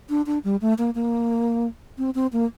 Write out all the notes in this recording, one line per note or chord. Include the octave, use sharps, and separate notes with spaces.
D4
D4
G3
A3
A#3
A#3
C4
C4
A#3